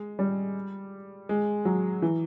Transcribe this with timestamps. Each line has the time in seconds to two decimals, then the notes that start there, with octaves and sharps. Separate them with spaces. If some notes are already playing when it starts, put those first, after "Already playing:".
Already playing: G#3
0.19 G3
1.29 G#3
1.65 F#3
2.02 E3